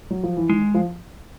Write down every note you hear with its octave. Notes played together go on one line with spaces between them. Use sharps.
F#3
F3
E3
D#3 G#3
F3